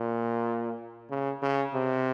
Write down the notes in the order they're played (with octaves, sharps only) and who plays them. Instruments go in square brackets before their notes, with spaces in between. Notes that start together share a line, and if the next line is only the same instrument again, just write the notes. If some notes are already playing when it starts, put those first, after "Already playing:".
Already playing: [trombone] A#2
C#3
C#3
C3